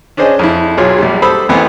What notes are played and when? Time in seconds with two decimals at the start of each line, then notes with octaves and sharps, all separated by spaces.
0.17 C#4 D4 G#4 C5 D#5 G#5
0.39 F2 E4
0.77 B1 F#3 F4 G#4 C#5
0.99 A#1 G3
1.22 A4 C5 B5 D#6 E6
1.49 A1 A2 E3 B3 C4 G#5